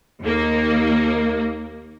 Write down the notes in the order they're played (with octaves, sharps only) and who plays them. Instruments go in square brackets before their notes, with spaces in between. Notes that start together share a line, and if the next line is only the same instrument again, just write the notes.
[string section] D#2 A#3